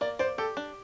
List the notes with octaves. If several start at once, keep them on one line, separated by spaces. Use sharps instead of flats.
A#3 D5
C5 D5
G4 A4
D4